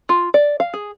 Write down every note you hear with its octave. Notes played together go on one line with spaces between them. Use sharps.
F4
D5
F5
G#4